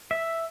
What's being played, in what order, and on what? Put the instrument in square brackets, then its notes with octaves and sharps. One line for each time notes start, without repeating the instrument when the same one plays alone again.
[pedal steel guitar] E5